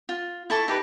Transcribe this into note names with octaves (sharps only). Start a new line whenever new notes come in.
F4
E4 A4 A5 C#6
D#4 G4 B4